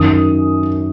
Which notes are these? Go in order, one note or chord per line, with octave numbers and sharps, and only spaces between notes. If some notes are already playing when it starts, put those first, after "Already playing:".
Already playing: F#2 D#3 D#6